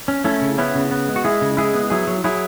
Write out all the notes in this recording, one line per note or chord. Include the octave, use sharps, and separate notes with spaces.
C#4
A3 C#4 E4
C#3
B3 C#4 E4
C#3
B3
G#3
F#4
G#3 E4 G#4
C#3
G#3 E4 G#4
B3
F#3 E4 G#4
F#3
F#3 E4 G#4